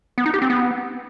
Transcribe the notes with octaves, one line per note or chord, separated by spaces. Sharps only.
B3
D#4
G4
C4
B3